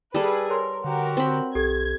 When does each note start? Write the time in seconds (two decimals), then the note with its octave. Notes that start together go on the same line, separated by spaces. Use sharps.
0.14 G3 G#4 A4 B4
0.49 A#4 B4 C#5 C6
0.84 D3 F#4 G4 A#4
1.17 C4 B5
1.55 B1 G4 A4 G#6